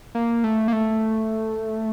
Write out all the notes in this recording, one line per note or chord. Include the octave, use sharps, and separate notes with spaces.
A#3
A3
A#3
A3